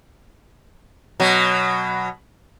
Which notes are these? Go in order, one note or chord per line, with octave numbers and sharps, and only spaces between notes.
B2 F#3